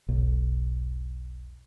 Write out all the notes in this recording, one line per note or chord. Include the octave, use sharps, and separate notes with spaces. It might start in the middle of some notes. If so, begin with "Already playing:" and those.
E1 B1